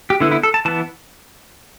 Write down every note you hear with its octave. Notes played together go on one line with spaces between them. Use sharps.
G4
D3 B3 E4
E4
A4
A5
E3 B3 A5